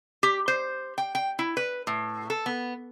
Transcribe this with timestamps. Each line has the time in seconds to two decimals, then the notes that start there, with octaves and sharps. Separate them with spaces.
0.23 G4
0.48 C5
0.98 G5
1.15 G5
1.39 E4
1.57 B4
1.87 A2
2.30 A4
2.46 B3